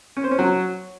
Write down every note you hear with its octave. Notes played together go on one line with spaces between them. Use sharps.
C#4
C5
C#4
F#3